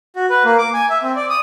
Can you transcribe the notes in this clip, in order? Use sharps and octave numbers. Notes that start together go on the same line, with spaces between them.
F#4
B4
A#3
D6
G#5
E5
C4
D5
D#6